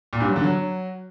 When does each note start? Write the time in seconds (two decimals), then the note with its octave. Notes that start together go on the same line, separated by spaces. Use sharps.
0.13 A#2
0.20 G2
0.28 F#3
0.36 D3
0.44 F#3